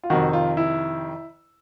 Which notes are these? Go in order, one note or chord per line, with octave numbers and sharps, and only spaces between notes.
F4
F2 C3 D#3 F#4
F4
E4